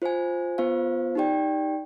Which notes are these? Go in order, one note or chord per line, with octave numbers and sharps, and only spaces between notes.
F4 C5 F5 G#5
B3 F4 C5 F5
D#4 G4 D5 G5